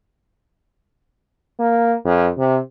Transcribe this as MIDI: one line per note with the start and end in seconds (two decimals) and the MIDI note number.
1.60 1.95 58
2.05 2.29 41
2.38 2.59 48